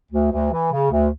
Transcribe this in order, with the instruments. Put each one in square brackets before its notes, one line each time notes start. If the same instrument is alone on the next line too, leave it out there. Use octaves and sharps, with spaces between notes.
[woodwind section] D2
D2
E3
C#3
D2